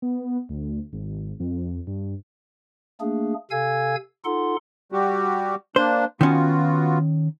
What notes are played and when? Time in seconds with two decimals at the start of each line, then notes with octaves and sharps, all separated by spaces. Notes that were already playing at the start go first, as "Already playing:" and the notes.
0.02 B3
0.49 D2
0.93 G#1
1.40 F2
1.87 G2
3.00 A3 A#3 D4 G#4
3.51 C3 A4 F5 G#5 E6 G#6
4.25 D#4 F4 A4 F#5 C6
4.92 G3 F#4 G4
5.76 A#3 D4 C5
6.21 D#3 B3 C#4 F4 F#4